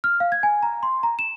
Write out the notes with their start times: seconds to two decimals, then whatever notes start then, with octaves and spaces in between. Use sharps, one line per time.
0.04 F6
0.20 F5
0.32 G#6
0.43 G#5
0.63 A#5
0.83 C6
1.03 A#5
1.19 E7